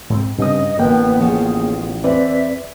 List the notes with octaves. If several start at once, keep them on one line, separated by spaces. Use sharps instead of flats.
G#2 G#3 C4
G2 C#3 C4 C#4 D#5 D#6
A1 D3 A#3 B3 G5
F3 B3 C#4 G#4
E2 C4 B4 D5 E5